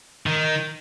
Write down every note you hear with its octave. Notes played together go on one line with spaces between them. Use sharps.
D#3